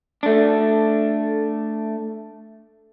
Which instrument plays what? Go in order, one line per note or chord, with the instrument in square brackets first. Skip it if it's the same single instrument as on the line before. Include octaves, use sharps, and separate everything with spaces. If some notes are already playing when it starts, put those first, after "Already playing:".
[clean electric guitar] A3 D4